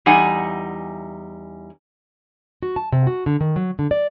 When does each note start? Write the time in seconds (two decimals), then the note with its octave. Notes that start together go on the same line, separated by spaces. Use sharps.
0.06 E2 G3 D#4 F#5 G#5
2.63 F#4
2.76 A5
2.92 C3
3.07 F#4
3.26 D3
3.41 D#3
3.56 F#3
3.79 D3
3.91 D5